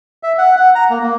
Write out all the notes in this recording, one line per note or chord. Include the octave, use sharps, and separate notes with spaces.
E5
F#5
F#5
A#5
A#3
A#3